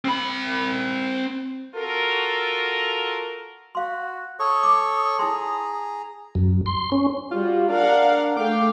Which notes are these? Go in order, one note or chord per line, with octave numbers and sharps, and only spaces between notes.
C4 B5
F4 F#4 A4 A#4
F#4 F5 C6
A4 C#5 C#6 D#6
D6
E4 G#4 A5 A#5 C6
F#2
C6
C#4
G3 F4 F#4
D4 A#4 F5 F#5
A3 F5 G5 D6